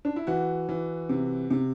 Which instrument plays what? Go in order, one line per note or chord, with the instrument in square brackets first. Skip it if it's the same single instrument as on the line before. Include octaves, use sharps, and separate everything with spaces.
[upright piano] D4
E4
E3 F#4
E3
C3
C3